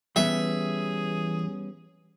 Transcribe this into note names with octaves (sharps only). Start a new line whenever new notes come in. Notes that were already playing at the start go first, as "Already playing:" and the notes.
E3 G3 B3 C#4 G#4 E5